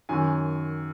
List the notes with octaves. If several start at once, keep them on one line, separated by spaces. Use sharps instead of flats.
F#2 D#3 G#5